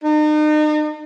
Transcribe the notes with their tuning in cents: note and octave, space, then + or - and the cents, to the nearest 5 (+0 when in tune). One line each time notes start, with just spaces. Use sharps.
D#4 -40